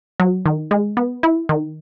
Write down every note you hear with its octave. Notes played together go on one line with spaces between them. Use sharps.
F#3
D#3
G#3
B3
E4
D#3